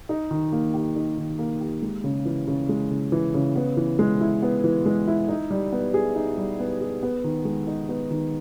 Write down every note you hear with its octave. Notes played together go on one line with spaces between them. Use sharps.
D#4
D#3
A#3
G4
D#4
D#3
A#3
G4
G#3
C#3
E3
C#3
G#3
C#3
E3
C#3
B3
E3
G#3
E4
B3
E3
G#3
E4
D#4
G3
B3
G#4
D#4
G3
B3
G#4
B3
D#3
G#3
D#4
B3
D#3